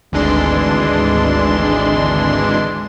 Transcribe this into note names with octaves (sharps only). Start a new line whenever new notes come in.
G#1 D2 E3 G#3 D4 C6